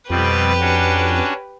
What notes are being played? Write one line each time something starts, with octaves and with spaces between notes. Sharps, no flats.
F2 B2 G3 C4 G4 B4
C#4 D4 F#4